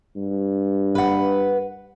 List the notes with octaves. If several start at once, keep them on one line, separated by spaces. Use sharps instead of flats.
G2
B4 F#5